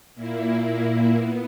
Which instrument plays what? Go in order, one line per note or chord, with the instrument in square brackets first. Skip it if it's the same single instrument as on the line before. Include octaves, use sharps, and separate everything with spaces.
[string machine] A#2 A#3 E4
B3